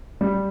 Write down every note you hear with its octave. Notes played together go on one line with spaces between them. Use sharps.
G3